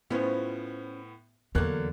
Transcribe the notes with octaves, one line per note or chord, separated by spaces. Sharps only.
A2 B3 C#4 F4 C5
E2 D3 F#3 A#3 F#6